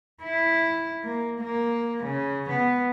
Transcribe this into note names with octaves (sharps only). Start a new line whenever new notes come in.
E4
A#3
A#3
C#3
B3